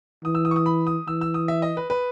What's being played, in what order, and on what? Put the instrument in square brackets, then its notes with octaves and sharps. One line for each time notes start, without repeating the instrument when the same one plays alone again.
[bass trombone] E3 [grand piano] D#6
[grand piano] E6
D#6
C#6
D#6
B5
D#6
[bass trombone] E3 [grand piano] E6
[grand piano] E6
D#6
E5
D#5
B4
B4